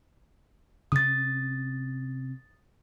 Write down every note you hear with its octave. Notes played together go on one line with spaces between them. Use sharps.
C3 C#4 D#6 A6